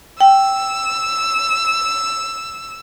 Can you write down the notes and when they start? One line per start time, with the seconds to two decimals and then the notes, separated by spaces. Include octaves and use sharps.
0.20 G5 E6